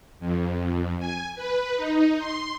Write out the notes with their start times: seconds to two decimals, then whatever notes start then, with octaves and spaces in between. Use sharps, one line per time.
0.20 F2
0.99 G#5
1.36 B4
1.76 D#4
2.19 C6